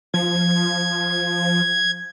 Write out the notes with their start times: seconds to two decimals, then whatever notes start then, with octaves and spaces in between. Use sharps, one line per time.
0.14 F3 G#6